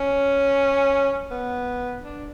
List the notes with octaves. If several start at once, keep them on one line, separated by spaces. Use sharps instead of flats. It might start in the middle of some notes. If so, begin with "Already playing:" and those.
Already playing: C#4
B3
D4